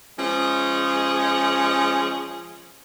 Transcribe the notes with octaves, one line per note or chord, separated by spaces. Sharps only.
F3 G#3 C#4 G#4